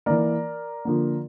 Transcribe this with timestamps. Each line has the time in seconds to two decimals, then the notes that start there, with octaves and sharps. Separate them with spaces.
0.06 E3 A#3 A#4 D5
0.85 D3 F3 A#3